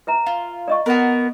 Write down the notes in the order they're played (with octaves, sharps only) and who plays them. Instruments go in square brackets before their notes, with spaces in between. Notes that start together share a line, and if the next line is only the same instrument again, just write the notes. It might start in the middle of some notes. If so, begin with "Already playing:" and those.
[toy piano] B4 E5 A#5
[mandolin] F4
[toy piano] D5 D#5 C#6
[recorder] B3 [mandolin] F#4 A#4